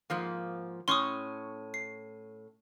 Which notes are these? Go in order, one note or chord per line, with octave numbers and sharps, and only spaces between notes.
G#2 F3 A#3
A2 C#4 C6 C#6 D#6
C7